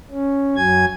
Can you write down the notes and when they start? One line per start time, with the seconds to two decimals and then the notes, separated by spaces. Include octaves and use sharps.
0.11 C#4
0.56 F#2 F#3 G#5 G#6